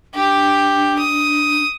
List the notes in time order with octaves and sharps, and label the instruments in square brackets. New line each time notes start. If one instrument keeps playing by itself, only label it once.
[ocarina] D4 [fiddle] G4
[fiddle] D#6